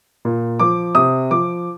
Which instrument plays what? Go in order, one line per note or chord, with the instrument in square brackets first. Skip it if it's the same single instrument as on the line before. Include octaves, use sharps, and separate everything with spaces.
[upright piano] A#2
F3 D6
C3 D#6
F3 D6